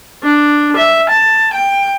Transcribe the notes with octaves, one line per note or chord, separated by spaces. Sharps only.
D4
E5
A5
G5